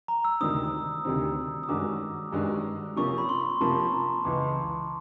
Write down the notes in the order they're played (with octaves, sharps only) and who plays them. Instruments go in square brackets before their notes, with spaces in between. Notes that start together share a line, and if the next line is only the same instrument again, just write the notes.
[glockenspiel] A#5
E6
[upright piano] D2 C3 D#3 G3 C4 [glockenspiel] D#6
[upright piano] D2 C3 D#3 G3 C4
[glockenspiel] D#6
[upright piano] G2 D#3 G#3 C#4 F#4 [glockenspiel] D6
[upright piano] G2 D#3 G#3 C#4 F#4
[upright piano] C3 F3 A#3 C#4 [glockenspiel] C#6
[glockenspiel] B5
C6
[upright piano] C3 F3 A#3 C#4 [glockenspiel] A5
[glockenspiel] A#5
[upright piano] C#2 C#3 E3 [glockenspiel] D6